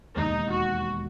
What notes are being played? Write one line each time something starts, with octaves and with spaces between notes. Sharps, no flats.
E1 D#2 D#3 D#4
F#4